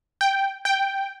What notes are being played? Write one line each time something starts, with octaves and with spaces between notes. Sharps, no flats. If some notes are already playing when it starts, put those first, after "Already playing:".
G5
G5